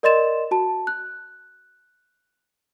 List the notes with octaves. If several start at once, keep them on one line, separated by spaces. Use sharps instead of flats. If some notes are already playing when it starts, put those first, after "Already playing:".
A#4 D5 D#5 C6 A6 E7
F#4 A5
F#6